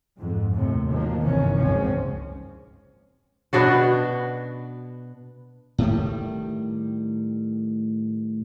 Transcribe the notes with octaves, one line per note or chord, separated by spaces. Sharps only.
F2 G#2
D#2 A2 C3
D#3 F3 F#3 A#3
G1 A2 C3 D#3 E3 C#4
F#1 C#2 G#2 F3 C4 C#4
B2 B3 D4 F#4
A2 D#3 G3